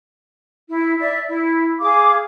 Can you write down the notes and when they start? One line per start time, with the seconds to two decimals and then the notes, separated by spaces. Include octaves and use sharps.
0.69 E4
0.99 D5 E5
1.27 E4
1.80 G#4 F5 D6